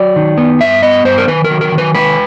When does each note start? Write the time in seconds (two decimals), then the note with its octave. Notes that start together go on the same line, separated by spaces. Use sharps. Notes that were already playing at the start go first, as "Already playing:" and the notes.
Already playing: F#3 D5
0.16 D#3
0.38 B3
0.61 G2 E5
0.83 B3 D#5
1.05 G2 C5
1.18 A#4
1.28 D#3 B4
1.44 A#4
1.50 F#3
1.61 A#4
1.72 D#3
1.78 B4
1.95 G#3 B4